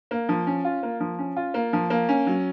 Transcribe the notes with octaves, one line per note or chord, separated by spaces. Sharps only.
A#3
F3
C#4
F4
A#3
F3
C#4
F4
A#3
F3
A#3
C#4
F#3